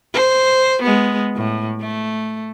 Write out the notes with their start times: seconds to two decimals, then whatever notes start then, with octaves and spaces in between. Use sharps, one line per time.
0.14 C5
0.82 G#3 B3
1.36 A2
1.81 A3